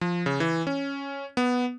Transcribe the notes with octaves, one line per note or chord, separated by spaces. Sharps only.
F3
C#3
E3
C#4
B3